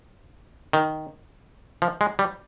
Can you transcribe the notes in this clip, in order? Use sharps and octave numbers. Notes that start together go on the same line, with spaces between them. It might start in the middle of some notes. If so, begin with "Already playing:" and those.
D#3
F3
G#3
G3